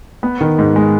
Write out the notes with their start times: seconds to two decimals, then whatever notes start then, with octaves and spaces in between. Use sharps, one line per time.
0.23 B3
0.41 D#3
0.59 G#2
0.76 G#3